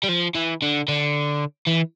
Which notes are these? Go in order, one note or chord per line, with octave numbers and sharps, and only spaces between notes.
G3
F3
E3
D3
D3
E3